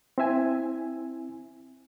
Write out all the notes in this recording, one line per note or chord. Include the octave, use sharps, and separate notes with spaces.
C4 E4 E5 G#5